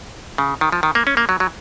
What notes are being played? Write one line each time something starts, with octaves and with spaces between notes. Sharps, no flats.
C#3
D#3
F3
D#3
A#3
C#4
A#3
F#3
F#3